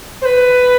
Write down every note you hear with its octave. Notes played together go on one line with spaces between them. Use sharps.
C5
B4